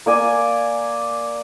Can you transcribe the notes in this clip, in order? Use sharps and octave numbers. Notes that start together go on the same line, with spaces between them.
A#3 D5 G#5